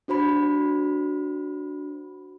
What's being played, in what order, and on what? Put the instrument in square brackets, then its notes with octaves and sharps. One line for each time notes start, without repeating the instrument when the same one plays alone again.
[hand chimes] D4 F#4 C5 B5